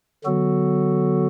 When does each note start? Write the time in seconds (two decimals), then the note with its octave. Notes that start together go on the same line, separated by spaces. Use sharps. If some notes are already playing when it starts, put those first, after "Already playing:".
0.24 D3 F#3 B3 F#4 A4